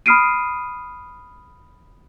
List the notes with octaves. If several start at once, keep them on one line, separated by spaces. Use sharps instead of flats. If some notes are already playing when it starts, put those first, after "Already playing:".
B5 D#6 F6 C7 D7 D#7